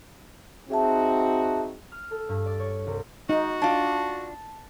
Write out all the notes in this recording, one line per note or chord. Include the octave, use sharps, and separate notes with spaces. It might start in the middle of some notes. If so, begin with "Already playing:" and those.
C4 D#4 F#4 G#4 E5 A5
F6
A4
G2
D5
C#5
C2
D#4 F#4
D4 F4 A5